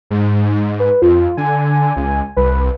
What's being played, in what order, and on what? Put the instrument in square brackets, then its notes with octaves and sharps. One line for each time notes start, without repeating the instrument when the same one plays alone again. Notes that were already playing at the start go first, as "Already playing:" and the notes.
[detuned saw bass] G#2
[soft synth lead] B4
[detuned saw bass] F2 [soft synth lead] F4
[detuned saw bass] D3 [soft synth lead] G#5
[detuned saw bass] C#2
[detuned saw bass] C2 [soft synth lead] B4